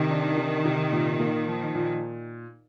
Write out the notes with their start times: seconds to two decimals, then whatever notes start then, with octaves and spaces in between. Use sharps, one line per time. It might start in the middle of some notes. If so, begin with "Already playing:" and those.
Already playing: C3 D#3
0.09 D4
0.37 C3
0.65 C3
0.92 A#2
1.19 A#3
1.48 F3
1.75 A#2